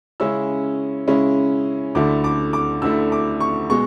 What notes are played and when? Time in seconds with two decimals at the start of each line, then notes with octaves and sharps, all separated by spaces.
0.20 C#3 G#3 C#4 E4 E6
1.07 C#3 G#3 C#4 E4
1.95 D2 D3 A3 E4 D6
2.24 D6
2.53 D6
2.82 D2 D3 A3 E4 E6
3.12 D6
3.40 C#6
3.70 B2 G#3 C#6